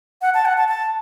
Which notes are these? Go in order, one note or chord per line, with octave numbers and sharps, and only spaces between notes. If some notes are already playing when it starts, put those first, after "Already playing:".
F#5
A5
F#5
A5
A5